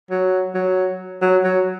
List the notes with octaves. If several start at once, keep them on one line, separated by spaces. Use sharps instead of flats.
F#3
F#3
F#3
F#3